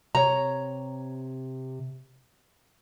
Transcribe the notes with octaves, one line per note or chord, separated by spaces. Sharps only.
C3 C#5 A#5